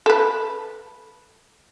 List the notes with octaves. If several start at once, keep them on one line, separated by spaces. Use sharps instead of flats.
A4 B4